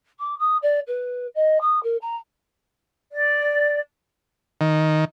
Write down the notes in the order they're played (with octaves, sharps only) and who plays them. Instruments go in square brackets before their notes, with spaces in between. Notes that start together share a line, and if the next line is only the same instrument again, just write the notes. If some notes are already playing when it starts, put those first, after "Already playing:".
[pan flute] D6
D#6
D5
B4
D#5
D#6
A#4
A#5
[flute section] D5
[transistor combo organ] D#3